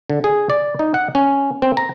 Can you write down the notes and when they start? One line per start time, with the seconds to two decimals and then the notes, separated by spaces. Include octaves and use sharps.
0.10 D3
0.24 G#4
0.50 D5
0.79 D#4
0.94 F#5
1.15 C#4
1.62 C4
1.77 A#5